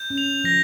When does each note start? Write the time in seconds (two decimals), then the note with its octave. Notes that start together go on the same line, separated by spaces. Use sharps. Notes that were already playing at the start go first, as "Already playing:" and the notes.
Already playing: G6
0.10 C#4
0.18 F7
0.44 F3 A#6